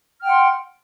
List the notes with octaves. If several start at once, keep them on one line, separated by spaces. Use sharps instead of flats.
F#5 G5 C6 F6